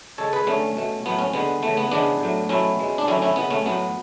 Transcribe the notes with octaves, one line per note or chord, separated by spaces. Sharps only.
C#3 G#3 A4 C#5
G#4 B4
D3 A3 C#4
B2 A3
A2 F#3 A3 B3
C#4
D3 G#3 B3
C#3 E3 A3
B3
C#3 E3 G#3 B3 D4
A2 F#3 A3
B2 F#3 A3 C#4 E4
B2 G#3
D4
D3 F#3 A3 C#4 E4
C#4 E4
C#3 G#3 B3
A3 C#4
A2 F#3 A3 B3